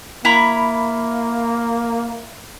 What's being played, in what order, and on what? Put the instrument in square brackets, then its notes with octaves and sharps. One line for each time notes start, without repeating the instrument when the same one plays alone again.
[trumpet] A#3 [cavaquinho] E4 A#5 B5